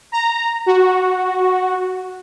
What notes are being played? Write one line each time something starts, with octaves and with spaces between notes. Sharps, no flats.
A#5
F#4